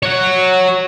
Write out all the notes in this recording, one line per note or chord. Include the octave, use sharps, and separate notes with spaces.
C#5 F#5